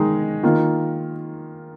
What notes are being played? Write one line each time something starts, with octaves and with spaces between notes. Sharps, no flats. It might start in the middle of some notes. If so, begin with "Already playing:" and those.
Already playing: D#3 G#3 D#4 G#4
D#3 A#3 F4